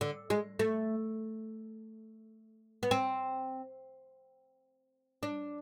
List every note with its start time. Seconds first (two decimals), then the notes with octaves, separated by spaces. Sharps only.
0.01 D3
0.30 G#3
0.59 A3
2.83 B3
2.91 C4
5.23 D4